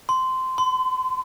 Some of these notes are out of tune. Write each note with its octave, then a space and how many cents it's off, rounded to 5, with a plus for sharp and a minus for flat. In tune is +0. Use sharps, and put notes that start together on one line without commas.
C6 -15
C6 -40